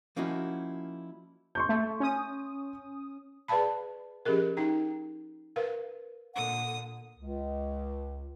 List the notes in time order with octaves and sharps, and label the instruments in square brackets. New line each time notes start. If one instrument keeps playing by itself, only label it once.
[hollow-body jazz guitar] F3 A#3 C#4 D#4 E4 F#4
[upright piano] C6 C#6 G6
[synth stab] A3
C#4 D#6
[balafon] G#4 B4 D5 F5 A5 B5
F3 C#4 G4 G#4 A#4
D#4 G5 A#5
A#4 B4 F5
[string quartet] A#2 D3 D#6 [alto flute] F#5
[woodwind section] C#2